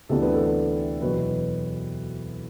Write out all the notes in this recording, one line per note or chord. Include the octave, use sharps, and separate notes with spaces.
D2 C3 E3 B3 D4 A4
B4
A4
E2 B2 F#3 B4